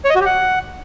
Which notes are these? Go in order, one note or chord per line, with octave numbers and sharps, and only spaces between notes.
C#5
D#5
F#4
G4
F#5